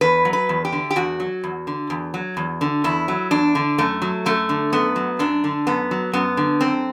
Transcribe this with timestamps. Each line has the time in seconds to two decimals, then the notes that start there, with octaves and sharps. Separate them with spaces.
0.01 E2 B4
0.25 F#3
0.33 B4
0.49 E2
0.65 G4
0.72 D3
0.91 G4
0.96 E2 F#4
1.20 F#3
1.44 E2
1.67 D3
1.90 E2
2.14 F#3
2.37 E2
2.61 D3
2.84 E2 E4
3.08 F#3
3.31 E2 D4
3.55 D3
3.78 F#2 A3
4.02 F#3
4.26 F#2 A3
4.49 D3
4.72 F#2 B3
4.96 F#3
5.19 F#2 D4
5.44 D3
5.67 F#2 B3
5.91 F#3
6.13 F#2 B3
6.37 D3
6.61 F#2 C4